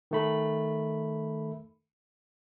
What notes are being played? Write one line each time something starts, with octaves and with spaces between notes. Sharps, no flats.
D#3 A3 B5